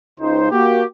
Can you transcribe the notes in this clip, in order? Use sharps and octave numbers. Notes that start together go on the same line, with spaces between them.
C#2 D#4 C5
A#3 F#4 G4